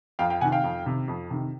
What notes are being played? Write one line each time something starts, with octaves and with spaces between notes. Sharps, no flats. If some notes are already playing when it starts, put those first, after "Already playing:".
F2 F5 G5
F5 G5
C3 D#3 F#5 G#5
F5 G5
F2
C3 D#3
F2
C3 D#3